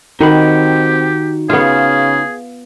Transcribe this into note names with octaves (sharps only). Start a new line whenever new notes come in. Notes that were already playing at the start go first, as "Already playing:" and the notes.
D#3 C4 D#4 F#4 G4 B5
C#3 B3 F4 G#4